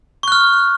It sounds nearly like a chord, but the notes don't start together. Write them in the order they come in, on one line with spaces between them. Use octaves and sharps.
C#6 F#6 F6